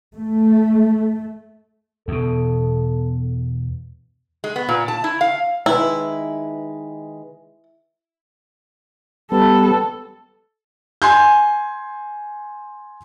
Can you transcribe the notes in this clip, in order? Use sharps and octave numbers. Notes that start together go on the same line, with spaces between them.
A3
E2 B2 A4
G#3
B3
A#2
A5
E4
F5
D#3 G#3 E4 B4
G3 B3 A4
G#5 C6 G6